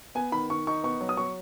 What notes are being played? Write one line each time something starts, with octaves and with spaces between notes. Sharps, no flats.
B3 G#5
D#3 B5
D#3 C#6
D#4 C#6
B3 C#6
F#3
D#6
F#3 C#6